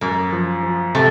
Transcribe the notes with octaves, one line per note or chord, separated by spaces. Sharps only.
F#2 A#3
F3
F3
C3 A3